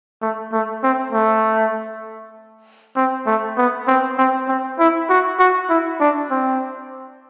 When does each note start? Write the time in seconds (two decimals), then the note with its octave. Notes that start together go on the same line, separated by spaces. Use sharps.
0.22 A3
0.52 A3
0.83 C4
1.13 A3
2.96 C4
3.27 A3
3.57 B3
3.87 C4
4.18 C4
4.48 C4
4.79 E4
5.09 F#4
5.39 F#4
5.70 E4
6.00 D4
6.31 C4